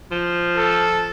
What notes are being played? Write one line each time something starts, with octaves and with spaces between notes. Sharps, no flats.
F3
A4